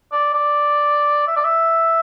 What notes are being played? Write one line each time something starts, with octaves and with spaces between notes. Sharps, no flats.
D5
D5
E5
D5
E5